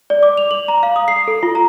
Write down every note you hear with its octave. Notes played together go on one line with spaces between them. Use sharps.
D5
D6
F7
F#7
A#5
F5
D#6
C7
A4
F4
A#5